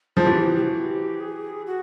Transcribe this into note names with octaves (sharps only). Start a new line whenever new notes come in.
F3 G#4
E3 G4
G4
F#4
G4
G#4
F#4